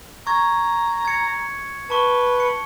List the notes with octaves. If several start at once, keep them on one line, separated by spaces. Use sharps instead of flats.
A#5 C#6 G#6
G#6 C#7
B4 A5 C#6 G7
C#7